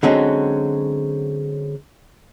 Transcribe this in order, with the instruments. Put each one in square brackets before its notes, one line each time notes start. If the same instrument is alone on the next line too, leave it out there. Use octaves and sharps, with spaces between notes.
[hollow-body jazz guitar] D3 F#3 G#3 C4 C#4